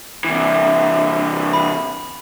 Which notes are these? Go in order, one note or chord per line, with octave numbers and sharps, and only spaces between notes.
C3 E3
B5